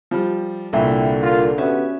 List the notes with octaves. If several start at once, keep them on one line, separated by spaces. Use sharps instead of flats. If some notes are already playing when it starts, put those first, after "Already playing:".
F3 G3
C2 A#2 D3 E4 E5 G5
F4 A#4
B3 C#4 F#4 G4 E5